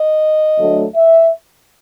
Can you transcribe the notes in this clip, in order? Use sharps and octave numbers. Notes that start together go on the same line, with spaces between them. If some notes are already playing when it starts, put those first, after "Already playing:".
Already playing: D#5
D2 D3 F#3 A3
E5